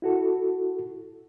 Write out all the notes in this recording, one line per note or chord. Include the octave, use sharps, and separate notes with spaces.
E4 F#4 A4